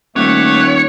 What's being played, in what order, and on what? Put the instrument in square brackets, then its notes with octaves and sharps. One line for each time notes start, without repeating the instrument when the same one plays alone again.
[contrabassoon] D#1 [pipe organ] A3 D6 F#6 [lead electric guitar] C#5